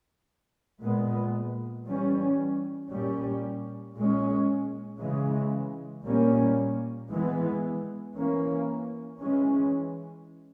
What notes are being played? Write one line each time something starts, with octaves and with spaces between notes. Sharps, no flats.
A#2 G#3 B3
E3 G3 C#4
A#2 G3 C#4
A#2 G#3 C#4
C#3 E3 G#3
A#2 G3 A#3 C#4
E3 G#3 B3
E3 A#3 C#4
E3 G#3 C#4